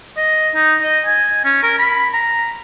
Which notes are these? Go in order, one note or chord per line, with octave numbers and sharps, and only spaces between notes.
D#5
D#4
D#5
G#5
C#4
A#4
B5
A#5